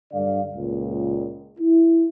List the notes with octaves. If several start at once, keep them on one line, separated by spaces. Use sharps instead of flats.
G2 D3 D5 F5
C#2 A#2
E4